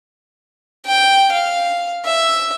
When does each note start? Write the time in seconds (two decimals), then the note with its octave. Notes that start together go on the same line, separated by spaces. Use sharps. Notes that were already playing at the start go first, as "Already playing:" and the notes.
0.86 G5
1.32 F5
2.05 E5